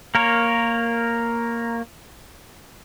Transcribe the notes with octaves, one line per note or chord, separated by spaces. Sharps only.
A#3 A#4 C#5